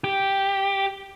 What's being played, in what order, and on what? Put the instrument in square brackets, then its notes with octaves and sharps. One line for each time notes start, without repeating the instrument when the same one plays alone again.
[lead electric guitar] G4